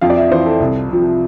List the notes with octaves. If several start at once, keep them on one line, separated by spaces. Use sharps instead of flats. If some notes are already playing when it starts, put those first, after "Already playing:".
F2 F5
D5
E5
E3 C5
A4
C2
C3 F3